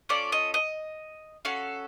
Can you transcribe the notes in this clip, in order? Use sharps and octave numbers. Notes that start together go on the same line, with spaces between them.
C#4 F4 A4 D5
D#5
D#5
C#4 F#4 A4 F5